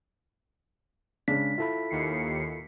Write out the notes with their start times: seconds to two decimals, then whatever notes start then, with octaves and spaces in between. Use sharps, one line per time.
1.28 C#3 G#3 D4 B6
1.58 E4 F4 A4 B5
1.89 D#2 C7 C#7